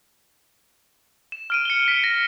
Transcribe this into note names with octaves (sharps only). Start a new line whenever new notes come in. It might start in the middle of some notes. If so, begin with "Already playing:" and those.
E7
F6 D7 D#7
C#7 G7
B6 C#7
A#6